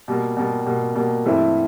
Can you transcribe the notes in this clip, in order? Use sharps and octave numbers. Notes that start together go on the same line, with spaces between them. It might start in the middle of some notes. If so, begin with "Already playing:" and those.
B2 G3 A#3
B2 G3 A#3
B2 G3 A#3
B2 G3 A#3
G2 E3 A3 C4 E4